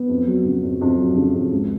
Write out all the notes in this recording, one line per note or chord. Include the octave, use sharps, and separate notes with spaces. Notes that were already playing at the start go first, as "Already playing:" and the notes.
Already playing: B3
F2
F#3
C#3
F2
F2
F#3
C#3
F2
C#2